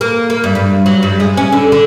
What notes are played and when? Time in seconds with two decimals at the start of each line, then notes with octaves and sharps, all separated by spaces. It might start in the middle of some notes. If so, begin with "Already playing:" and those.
0.01 A#3
0.30 A#3
0.44 G2
0.55 G2
0.86 F#3
1.03 G2
1.20 G#3
1.37 C#4
1.52 D3
1.72 D3